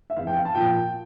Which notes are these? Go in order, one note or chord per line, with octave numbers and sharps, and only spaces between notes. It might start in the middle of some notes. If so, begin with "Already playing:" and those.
E5
F1 E2 E3 F5
G5
F5
A5
A#2 F3 G5